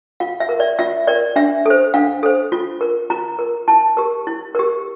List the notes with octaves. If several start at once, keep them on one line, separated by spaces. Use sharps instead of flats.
F4 F5
E5
A#4
D5
F4 E5
A#4 D5
D4 E5
A4 C5
D4 F5
A4 C5
F4
A#4
F4 A#5
A#4
E4 A5
G4 A#4
E4
G4 A#4